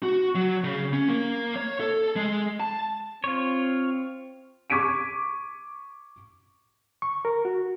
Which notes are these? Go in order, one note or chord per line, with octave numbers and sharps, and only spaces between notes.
F#4
F#3
C#3
C#4
A#3
C#5
A4
G#3
A5
C4 F4 C#5
C#6 D6 G#6 B6 D7 D#7
C#6
A#4
F#4